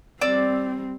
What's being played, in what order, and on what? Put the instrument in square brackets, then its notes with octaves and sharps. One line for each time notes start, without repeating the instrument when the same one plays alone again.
[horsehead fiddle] G3 C4 [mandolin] D5 E6